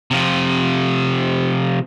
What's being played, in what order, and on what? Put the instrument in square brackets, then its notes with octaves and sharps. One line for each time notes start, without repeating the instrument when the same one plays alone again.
[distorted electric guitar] C3 F3